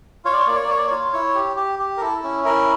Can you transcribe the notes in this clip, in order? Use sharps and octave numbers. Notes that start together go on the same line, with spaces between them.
F4 C#5
D5
C#5
A#3 D5
C#5
D5
A#3 C#5
D5
C#5
F4
E4 C#5
G4
G4
G4
A#4
E4 A4
C#4
E4 A#4